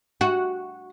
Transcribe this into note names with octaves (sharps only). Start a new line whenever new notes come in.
F#4